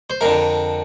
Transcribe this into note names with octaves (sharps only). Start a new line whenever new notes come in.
C5
F2 D3 A#4